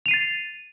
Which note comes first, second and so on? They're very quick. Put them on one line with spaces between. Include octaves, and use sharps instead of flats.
F7 D#7 C7 A6